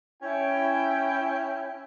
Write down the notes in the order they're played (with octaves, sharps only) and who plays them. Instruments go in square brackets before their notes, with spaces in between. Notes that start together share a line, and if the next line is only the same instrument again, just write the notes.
[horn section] C#4 E4 G5